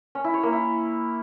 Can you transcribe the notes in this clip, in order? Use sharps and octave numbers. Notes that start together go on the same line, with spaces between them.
C#4
E4
C#5
A#3
E4